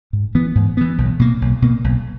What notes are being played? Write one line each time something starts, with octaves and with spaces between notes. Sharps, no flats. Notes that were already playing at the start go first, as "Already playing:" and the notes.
G#2
E3 B3
G#2
E3 B3
B1
B2 A#3
B1
B2 A#3
B1